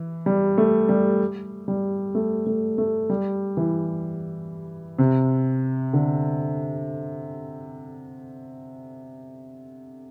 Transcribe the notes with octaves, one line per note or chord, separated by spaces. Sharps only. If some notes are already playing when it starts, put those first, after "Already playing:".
Already playing: E3
G3
A3
G3
G3
A3
A3
A3
G3
E3
C3
D3